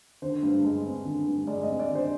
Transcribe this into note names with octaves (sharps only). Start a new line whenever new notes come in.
D3 C5
G2
G#3
C4
D3
G2
G#3 D5
D#5
C4
D5
D3
C5